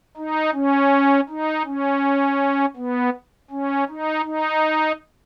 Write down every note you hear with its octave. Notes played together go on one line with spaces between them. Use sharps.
D#4
C#4
D#4
C#4
B3
C#4
D#4
D#4